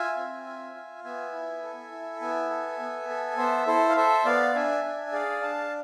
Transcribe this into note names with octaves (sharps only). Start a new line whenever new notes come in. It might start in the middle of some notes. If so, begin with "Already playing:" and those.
Already playing: F4 E5 G#5
C4
F4
F4
B3 E5 G#5
E4
A4
E4
B3 E5 G#5
A4
B3
A4
B3 C5 E5
E4 A4 C5
F5
A4 C5 E5
B3 D5 F5
D4 E5 G#5
D4
E5
G#4 D5 F5
D4 F5 A5